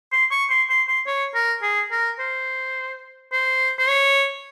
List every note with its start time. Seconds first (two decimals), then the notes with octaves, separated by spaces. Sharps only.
0.12 C6
0.31 C#6
0.50 C6
0.69 C6
0.88 C6
1.07 C#5
1.35 A#4
1.62 G#4
1.91 A#4
2.19 C5
3.32 C5
3.79 C5
3.88 C#5